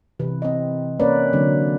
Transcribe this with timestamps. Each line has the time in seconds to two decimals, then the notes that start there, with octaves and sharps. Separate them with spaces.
0.20 C3 E3 B4
0.42 C4 D#5
1.00 A#3 C#4 A#4 B4 C#5 D5
1.33 D3 F#3 A#3 C4